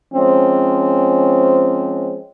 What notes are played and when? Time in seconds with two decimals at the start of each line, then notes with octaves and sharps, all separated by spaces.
0.14 F3 G#3 C4 C#4